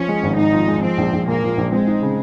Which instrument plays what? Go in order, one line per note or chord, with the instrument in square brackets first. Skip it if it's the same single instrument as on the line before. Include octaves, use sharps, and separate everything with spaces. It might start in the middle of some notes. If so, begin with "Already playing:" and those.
Already playing: [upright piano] F3 [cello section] C#4
[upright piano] G#3
G#1
[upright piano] G#2 [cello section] D#4
[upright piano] F3
G#3
[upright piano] F3 [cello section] C4
[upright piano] A#1
A#1
[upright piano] A#2 [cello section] A#3
[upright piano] F3
A#1
[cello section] G#3 [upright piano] C4
[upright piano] D#4
C#3